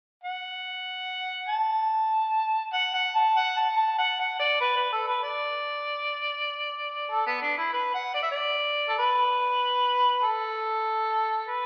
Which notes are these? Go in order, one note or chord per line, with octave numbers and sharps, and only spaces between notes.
F#5
A5
F#5
F#5
A5
F#5
A5
A5
F#5
F#5
D5
B4
B4
A4
B4
D5
A4
B3
D4
E4
B4
F#5
D5
E5
D5
A4
B4
A4
B4